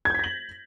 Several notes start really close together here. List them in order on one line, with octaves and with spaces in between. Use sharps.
G#6 G6 B6 A#6 F#7